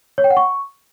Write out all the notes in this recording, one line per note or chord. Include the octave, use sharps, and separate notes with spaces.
C#5
G5
F#5
C#6